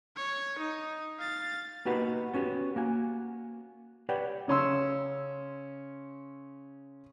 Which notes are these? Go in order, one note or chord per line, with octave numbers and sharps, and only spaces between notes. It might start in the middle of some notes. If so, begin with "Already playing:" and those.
C#5
D#4
F5 A6
A#3 B3 D#4 F#4 G4 B4
B3 C#4 F#4 G4
A#3 F#4 G#5
G4 B4 C#5 D5 F#5 G5
C#3 C#4 C6 E6